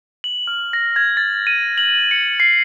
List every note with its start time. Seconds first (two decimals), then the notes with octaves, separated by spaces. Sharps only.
0.24 F#7
0.47 F6
0.73 A#6
0.96 G#6
1.17 A6
1.47 D#7
1.78 F#7
2.11 C#7
2.40 C7